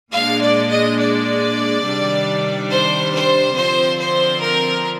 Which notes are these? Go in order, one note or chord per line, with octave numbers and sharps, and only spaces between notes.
A#2 G#3 D4 F5
D5
D#5
D5
C3 D#3 G3 D4
C5
C5
D3 F3 C4 C5
C5
A#4